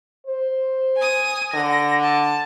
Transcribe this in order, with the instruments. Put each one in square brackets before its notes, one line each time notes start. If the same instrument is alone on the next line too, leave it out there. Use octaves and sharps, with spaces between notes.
[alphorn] C5
[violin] G#5 D#6
[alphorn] D3 [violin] A#6
[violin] A5